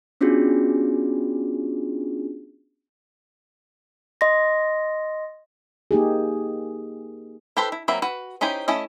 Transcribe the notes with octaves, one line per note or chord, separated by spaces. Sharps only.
B3 C#4 D4 F4 F#4 G#4
D#5 C6 A#6
A#3 D#4 G4 G#4
E4 G4 A4 B4 C5
E4
F#3 A#3 C4 E5 B5
F#4 B4
C#4 D#4 E4 G4 C5
A3 C#4 E4 D#5